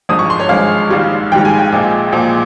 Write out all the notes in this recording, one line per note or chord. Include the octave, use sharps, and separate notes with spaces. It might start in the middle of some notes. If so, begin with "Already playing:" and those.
G#1 G2 F3 G#3 D#6
C#6
C6
C#5
G#1 G2 F3 G#3 F5
A#1 G#2 D#3 G3
A#1 G#2 D#3 G3 G5
G#5
G5
A#1 A#2 F3 G#3
A#1 A#2 F3 G#3